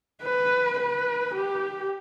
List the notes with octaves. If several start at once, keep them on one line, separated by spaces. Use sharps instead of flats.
B4
B4
G4